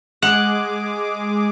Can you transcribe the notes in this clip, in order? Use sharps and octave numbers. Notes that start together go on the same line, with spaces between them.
G#3 G#4 F#5 D6